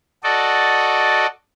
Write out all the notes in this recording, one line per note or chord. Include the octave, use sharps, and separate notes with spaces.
F#4 A4 D5 D#5